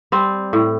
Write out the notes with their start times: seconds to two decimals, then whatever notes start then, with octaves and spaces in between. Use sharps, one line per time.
0.12 G3 C4
0.53 A2